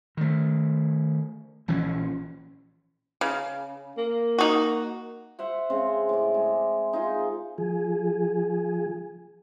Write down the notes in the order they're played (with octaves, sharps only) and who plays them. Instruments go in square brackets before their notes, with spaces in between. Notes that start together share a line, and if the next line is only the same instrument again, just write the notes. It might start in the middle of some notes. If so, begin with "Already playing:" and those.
[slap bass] D#3 A3
A#1 E3 F3 C#4
[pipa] C#3
[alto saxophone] A#3
[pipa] D#4 F#4
[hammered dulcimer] C5 E5 F#5
C#3 G#3 C4
A2 D5
G#3
D#4 F4 G#4
[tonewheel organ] F3 G#4